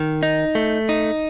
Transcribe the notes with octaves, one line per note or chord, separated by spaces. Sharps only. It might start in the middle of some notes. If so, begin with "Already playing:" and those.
Already playing: D#3
D#4
A3
D#4